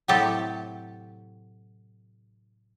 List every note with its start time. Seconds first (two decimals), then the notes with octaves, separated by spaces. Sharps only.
0.08 A2 C3 F#3 G4 A4 A5